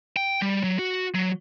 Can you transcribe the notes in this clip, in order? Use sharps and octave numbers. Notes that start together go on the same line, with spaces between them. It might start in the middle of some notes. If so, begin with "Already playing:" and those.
G5
G3
F#3
F#4
F#3